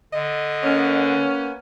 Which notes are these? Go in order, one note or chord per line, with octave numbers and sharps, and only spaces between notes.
D3 D#5
A#3 B3 C#4